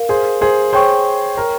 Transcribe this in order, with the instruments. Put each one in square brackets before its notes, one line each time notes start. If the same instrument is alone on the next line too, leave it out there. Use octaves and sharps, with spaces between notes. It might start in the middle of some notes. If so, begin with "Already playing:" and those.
Already playing: [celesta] A#4 F5
[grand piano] G#4 C5
G#4 C5
[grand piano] G#4 C5 [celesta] C#5 G5 C#6
[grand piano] A#4